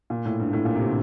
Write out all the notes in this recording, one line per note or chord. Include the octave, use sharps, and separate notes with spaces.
A#2
A2
G2
A2
A#2
C3
D3